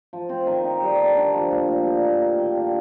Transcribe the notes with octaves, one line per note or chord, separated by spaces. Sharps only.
F3
C4
D#3
D#4
G3
A4
D3
F3
A#2
A#2
G3
A#3
A#3
D#3
D3